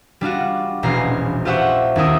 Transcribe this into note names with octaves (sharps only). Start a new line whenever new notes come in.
G3 D4 F4 F#4
E1 A#1 E2 C#4 A#5 C7
F4 G4 C5 E5 F#5 C#6
D#1 D4 E4 A#4 E5 D#6